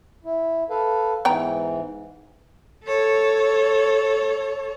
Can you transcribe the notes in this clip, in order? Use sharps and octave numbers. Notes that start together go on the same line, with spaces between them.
E4
A4 B4 F5
G#2 E3 B3 G5 A#5
A4 C#5